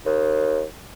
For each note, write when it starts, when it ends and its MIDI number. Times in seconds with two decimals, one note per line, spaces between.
0.06 0.62 39